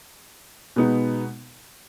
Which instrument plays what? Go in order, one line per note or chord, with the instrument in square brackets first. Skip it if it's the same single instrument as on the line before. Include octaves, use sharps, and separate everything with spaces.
[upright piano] B2 G#3 B3 D#4